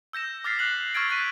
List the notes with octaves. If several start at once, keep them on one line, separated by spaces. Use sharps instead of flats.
E6 G6 A#6 E7
D6 F6 A6 B6 C7
F#6 F#7
C#6 E6 F6 G#6 A6 D7
F#6 A6 B6 D#7